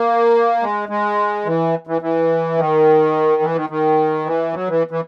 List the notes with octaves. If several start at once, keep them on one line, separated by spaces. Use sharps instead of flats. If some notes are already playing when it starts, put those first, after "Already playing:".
Already playing: A#3
G#3
G#3
E3
E3
E3
D#3
E3
D#3
D#3
E3
F#3
E3
E3